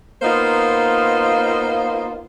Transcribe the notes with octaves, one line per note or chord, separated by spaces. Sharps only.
A#3 B3 D#4 F4 C5